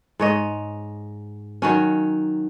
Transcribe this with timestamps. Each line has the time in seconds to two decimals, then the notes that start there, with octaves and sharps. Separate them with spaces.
0.20 G#2 C#5 D#5
1.62 D#3 F#3 C#4